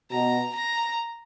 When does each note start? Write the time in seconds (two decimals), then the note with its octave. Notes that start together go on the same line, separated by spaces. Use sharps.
0.11 B2 A#5
0.55 A#5